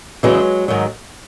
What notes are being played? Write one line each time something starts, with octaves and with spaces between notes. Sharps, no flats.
E2 C#3 E3 F#3 G#3
G#2 D#3 F#3